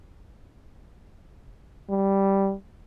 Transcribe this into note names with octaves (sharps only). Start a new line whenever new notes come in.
G3